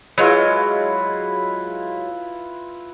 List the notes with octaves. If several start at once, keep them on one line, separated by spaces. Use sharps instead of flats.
F#3 G#3 E4 F4 B4